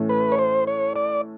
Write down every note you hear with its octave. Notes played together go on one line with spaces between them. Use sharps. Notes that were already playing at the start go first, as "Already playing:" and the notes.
Already playing: A2 E3 A3 C#4
B4
C#5
C5
C#5
D5